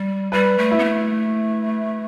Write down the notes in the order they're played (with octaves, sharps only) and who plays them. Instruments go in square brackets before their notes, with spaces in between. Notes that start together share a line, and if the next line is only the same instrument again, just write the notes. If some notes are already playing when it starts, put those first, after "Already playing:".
Already playing: [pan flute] G3
[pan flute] G3 [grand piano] B4
[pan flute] A3
[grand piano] E4
[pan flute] B3
A3